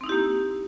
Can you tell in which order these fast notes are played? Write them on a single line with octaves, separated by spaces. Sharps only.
C4 D#4 E4 G4 A#3